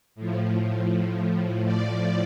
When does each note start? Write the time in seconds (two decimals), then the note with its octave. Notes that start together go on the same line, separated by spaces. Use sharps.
0.15 A2 F3
1.64 A2 F3 D5